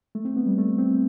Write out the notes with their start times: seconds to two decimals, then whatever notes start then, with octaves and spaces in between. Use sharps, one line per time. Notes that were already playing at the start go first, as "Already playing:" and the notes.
0.15 A3
0.25 C4
0.37 B3
0.46 G3
0.58 A3
0.78 C4